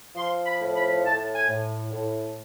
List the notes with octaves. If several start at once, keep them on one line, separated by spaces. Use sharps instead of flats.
F3 C6
B5
A2
B5
A2 A5
G#5
A2
A2